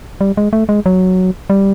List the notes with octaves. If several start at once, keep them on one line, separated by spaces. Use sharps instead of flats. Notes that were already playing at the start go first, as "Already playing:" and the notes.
G3
G#3
A3
G#3
F#3
G3